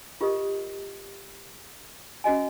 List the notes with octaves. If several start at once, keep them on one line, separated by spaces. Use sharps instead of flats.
F4 G4 A#4 D#5 D#6
C#4 F#4 D#5 G#5